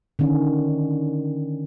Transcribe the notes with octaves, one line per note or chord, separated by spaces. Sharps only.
D3 D#3 C#4